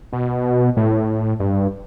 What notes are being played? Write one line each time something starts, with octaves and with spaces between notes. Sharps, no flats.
B2
A2
G2